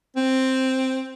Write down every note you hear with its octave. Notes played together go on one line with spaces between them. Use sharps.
C4